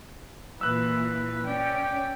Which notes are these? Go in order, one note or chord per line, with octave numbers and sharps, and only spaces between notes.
A#2 E3 B4 E6 F#6
C#4 D5 G5